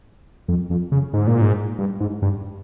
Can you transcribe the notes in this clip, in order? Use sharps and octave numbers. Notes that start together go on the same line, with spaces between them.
F2
F2
C#3
G#2
A#2
G#2
G2
G#2
G2